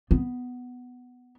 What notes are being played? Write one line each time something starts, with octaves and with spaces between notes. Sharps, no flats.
B3